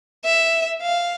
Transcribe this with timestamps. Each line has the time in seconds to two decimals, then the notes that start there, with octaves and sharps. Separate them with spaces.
0.25 E5
0.82 F5